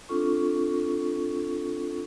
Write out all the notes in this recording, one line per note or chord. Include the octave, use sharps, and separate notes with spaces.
C4 D4 F4 A4 C#6